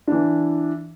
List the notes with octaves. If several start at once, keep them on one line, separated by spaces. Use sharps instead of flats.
E3 D4